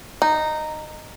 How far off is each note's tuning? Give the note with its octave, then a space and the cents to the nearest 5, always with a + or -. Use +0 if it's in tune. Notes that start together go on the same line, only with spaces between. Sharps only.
D#4 -10